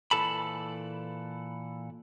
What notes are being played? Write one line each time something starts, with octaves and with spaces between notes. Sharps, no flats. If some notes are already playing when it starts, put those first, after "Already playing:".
A#2 E3 A4 A5 B5